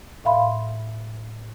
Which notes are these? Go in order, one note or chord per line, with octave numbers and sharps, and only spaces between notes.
A2 E5 F5 B5 C6